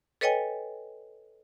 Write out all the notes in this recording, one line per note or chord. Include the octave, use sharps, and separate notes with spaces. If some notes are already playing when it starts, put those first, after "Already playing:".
A4 B4 C#5 D#5 G5 G#5